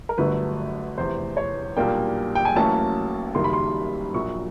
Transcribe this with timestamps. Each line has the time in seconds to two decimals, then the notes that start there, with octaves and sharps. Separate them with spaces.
0.09 A#4
0.18 G1 G2 D3 F#3 A3 B4
0.97 F1 E2 C3 C5
1.37 C#5
1.77 B1 A#2 G3 A#3 D4 G5
2.35 G5
2.45 G#5
2.55 A1 A2 F#3 A#3 C#4 A5
3.35 F#1 F#2 D#3 G3 A#3 C6
3.44 B5
3.53 C6
4.14 A#1 A#2 F#3 C#6